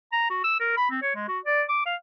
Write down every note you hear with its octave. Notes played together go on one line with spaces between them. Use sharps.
A#5
F#4
E6
A#4
B5
C4
C#5
G#3
F#4
D5
D6
F5